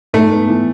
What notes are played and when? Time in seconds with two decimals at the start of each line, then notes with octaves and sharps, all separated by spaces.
0.13 G#2 A3
0.31 B3
0.49 E3